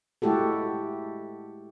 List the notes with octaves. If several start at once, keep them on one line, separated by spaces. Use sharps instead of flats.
G#3 A3 E4 F#4 G4 A4